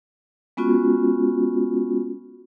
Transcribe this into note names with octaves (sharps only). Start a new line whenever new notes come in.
G#3 B3 C#4 F4 F#4